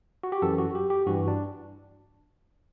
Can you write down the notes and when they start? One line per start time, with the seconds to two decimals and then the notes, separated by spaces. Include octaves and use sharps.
0.23 F#4
0.32 G4
0.42 F#2 E3 A4
0.58 F#4
0.75 G4
0.90 G4
1.06 G2 E3 F#4
1.28 D4